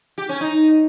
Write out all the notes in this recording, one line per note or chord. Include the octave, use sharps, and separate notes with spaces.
G4
C#4
D#4